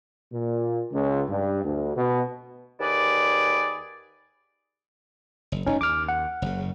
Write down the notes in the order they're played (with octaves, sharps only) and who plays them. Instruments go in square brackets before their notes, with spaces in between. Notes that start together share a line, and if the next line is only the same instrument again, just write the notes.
[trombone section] A#2
C#2
G2
D2
B2
[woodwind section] D#2 G#4 B4 D5
[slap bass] F#1
[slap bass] F1 [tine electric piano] C#4 D#4
[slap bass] D#2 [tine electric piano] D6 F6
[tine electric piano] F#5
[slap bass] F#1 C#3